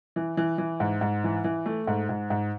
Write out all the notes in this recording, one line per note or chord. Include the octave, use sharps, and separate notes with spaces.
E3
E3
E3
G#2
G#2
E3
E3
A3
G#2
G#2
G#2